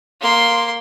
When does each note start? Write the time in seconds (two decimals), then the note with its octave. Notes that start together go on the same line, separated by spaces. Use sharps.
0.21 A#3 C6